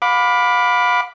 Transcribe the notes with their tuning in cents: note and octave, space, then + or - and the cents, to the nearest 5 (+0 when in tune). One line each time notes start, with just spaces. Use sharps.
F5 +40 B5 +0 D6 +0